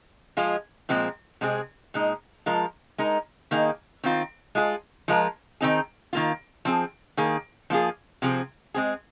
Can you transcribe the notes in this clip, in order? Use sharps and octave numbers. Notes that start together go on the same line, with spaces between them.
F3 G#3 F4 G#4
A#2 F3 G#3 C4
C3 G#3 C4 G#4
A#2 G#3 D#4
F3 G#3 F4 A#4
G#3 D#4 A#4
D#3 A#3 D#4 G#4
D#3 C4 F4
G#3 F4 G#4
F3 G#3 F4 A#4
D#3 C4 D#4 G#4
D#3 A#3 F4
F3 C4 G#4
D#3 A#3 G#4
F3 A#3 F4 G#4
C3 F3 C4 G#4
G#3 C4 G#4